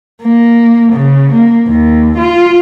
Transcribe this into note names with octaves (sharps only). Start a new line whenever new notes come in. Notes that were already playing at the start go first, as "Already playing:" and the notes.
A#3
C#3
A#3
D#2
F4